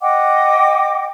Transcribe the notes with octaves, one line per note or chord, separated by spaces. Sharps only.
D#5 F#5 G5 D6